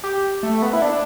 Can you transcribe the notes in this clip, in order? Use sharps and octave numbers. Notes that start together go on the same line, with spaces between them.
G4
A3
B3
E4
D4